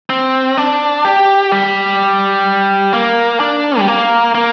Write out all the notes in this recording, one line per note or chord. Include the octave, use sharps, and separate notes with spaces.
C4
D4
G4
G3
A#3
D4
G3
A#3
A#3